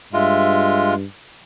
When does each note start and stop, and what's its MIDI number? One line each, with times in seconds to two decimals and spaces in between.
0.13 1.05 43
0.13 0.94 56
0.13 0.94 65
0.13 0.92 76